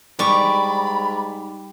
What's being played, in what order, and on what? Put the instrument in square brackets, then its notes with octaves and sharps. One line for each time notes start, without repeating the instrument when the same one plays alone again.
[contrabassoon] G#2 [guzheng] G3 [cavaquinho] D5 C#6 [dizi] B5